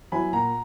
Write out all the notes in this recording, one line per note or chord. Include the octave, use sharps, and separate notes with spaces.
F#3 B3 E4 G#5 B5
A#2 F#5 A#5